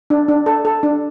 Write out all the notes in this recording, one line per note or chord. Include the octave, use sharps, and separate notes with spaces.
D4
D4
A4
A4
D4